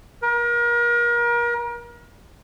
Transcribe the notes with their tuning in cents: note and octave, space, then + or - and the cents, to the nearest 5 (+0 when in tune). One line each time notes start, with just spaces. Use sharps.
A#4 +35